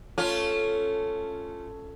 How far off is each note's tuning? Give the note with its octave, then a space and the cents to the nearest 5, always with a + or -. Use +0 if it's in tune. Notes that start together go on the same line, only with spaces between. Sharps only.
A3 +0 C#4 +0 F4 +0